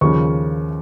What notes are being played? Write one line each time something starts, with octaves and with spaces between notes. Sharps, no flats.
D#2 C#3 F3 C#6